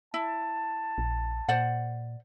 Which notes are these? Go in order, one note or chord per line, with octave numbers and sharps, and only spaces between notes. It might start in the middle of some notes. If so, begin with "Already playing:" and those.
E4 A5
A#1
A#2 C5 D5 F#5